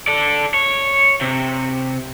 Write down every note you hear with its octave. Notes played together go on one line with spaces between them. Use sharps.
A4 D5
C#5
C3